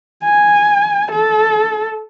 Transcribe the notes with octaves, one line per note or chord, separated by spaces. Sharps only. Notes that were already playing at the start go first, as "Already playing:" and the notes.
G#5
A4